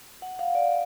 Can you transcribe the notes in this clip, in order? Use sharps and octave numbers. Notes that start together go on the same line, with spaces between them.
F#5
F5
D5